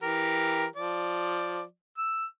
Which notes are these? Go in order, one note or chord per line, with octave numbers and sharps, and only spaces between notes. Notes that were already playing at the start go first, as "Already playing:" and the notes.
E3 G4 A#4
F3 D5
E6